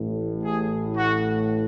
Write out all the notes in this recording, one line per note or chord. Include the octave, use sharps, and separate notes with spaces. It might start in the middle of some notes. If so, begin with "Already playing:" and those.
Already playing: A1 A2
G#4
F#4